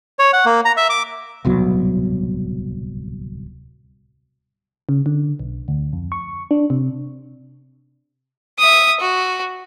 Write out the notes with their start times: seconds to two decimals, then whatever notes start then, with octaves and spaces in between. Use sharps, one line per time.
0.19 C#5
0.33 F#5
0.45 A#3
0.65 A#5
0.77 E5
0.90 D6
1.45 D1 C2 B2 F#3
4.89 C#3
5.06 D3
5.39 B1
5.68 D2
5.93 F2
6.12 C#6
6.51 D4
6.70 C3
8.59 E5 D#6
9.00 F#4